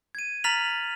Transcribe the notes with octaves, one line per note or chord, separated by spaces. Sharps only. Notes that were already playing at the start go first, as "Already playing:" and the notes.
G#6 D#7
A#5 F6 A6 B6 F7 F#7